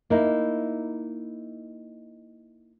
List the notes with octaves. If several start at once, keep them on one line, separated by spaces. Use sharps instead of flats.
A#3 D#4 E4